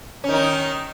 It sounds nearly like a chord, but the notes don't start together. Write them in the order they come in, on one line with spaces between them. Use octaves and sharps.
C#4 D#3 D#4